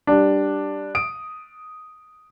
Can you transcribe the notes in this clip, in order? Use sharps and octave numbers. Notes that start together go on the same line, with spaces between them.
G3 D4
D#6 D7